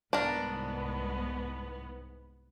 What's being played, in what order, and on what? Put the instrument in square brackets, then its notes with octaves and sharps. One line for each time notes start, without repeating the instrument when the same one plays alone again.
[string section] C2 G#2 B3 [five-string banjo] D4 A#4